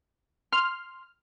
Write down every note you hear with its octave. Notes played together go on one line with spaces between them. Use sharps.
C6 F6